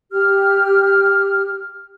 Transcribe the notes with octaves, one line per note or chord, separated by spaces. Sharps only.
G4 F6